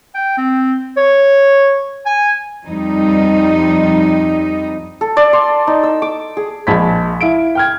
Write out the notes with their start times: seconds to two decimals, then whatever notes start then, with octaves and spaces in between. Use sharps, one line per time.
0.15 G5
0.38 C4
0.97 C#5
2.06 G#5
2.66 F2 G3 D#4
5.01 A4
5.17 D5
5.33 C6
5.67 D#4
5.83 E6
6.02 D6
6.37 G#4
6.67 A#1 G#3 A5 B5 G#6 B6
7.21 E4 F5 D7
7.55 G5 F6 G#6